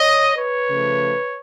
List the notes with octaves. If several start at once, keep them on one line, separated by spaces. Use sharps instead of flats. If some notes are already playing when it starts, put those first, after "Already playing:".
Already playing: C#5 D#5
B4 C#5
C#3 F3 A3